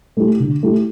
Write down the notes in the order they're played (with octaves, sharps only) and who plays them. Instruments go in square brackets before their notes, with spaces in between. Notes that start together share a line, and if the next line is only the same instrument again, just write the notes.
[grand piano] A3 E4 G4
D3
A3 E4 G4